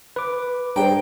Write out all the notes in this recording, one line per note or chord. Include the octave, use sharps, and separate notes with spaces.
B4 D6
G2 G#4 C5 G5 A#5